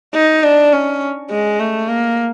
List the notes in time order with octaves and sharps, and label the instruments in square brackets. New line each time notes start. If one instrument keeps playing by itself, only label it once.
[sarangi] D#4
D4
C#4
G#3
A3
A#3